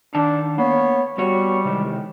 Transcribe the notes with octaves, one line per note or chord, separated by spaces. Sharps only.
D#3 D4 D#4 A5
A#3 B3 C#5
G3 B3 F#4 C#5
C3 D#3 E3 G#3